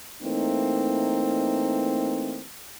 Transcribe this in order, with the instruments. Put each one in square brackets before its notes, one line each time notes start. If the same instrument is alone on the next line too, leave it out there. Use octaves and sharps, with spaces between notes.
[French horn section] E3 A3 A#3 C4 D#4